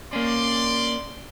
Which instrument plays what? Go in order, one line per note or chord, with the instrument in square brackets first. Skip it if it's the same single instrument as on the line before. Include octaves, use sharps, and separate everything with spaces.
[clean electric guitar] A#3 C#4 [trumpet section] D5 C6